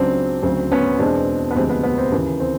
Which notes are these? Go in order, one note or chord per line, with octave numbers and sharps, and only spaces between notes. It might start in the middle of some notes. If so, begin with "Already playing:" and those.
Already playing: C#2 C#3 F#3 C4 D4
D2 C#3 F#3 C4
B3 C#4
E2 B2 G#3 C4 D4
B3
D2 C3 F3 G#3 C4
B3
B3
C4
D#2 C#3 E3
C4